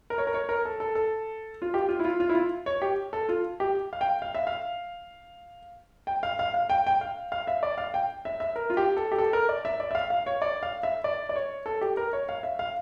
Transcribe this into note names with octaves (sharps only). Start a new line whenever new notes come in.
A#4
C#5
A#4
C#5
A#4
A4
A4
A4
F4
G4
F4
E4
F4
F4
E4
F4
C#5
G4
A4
F4
G4
F5
G5
F5
E5
F5
G5
F5
F5
F5
G5
G5
F5
F5
E5
D5
F5
G5
E5
E5
A#4
F4
G4
A4
G4
A4
A#4
D5
E5
D5
E5
F5
F5
C#5
D5
F5
E5
D5
D5
C#5
A4
G4
A#4
C#5
F5
E5
F5